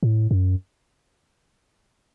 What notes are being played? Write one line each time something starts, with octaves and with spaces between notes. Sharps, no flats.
A2
F#2